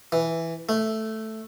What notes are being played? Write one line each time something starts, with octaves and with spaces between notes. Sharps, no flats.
E3
A3